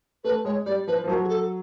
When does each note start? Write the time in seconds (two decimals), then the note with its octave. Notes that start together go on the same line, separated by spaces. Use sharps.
0.24 A3 B4
0.45 G#3 C#5
0.66 G3 D5
0.87 F3 B4
1.04 F3
1.08 F#3 A#4
1.24 G#4
1.29 A4